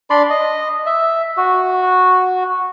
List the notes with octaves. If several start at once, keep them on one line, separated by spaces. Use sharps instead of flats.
D4 D5 B5 C6
D#5
E5
F#4